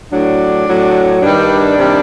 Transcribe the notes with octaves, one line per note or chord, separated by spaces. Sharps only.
A2 F#3 D4
A2 F#3
G2 D#3 G3 D4
C3 D#3 G3